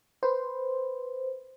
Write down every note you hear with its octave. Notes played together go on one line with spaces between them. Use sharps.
B4 C5